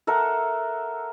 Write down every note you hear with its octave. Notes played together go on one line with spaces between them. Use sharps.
A4 A#4 E5 F#5